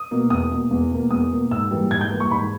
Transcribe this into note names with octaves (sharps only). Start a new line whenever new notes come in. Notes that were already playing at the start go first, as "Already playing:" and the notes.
Already playing: D#6
B2 A#3
E2 D#6
B2 A#3
E2
B2 A#3
E2 D#6
B2 A#3
G#2 E6
E3 G3 A#3
G#2 G#6
G6
E3 G3 A#3
C#6
G#2 B5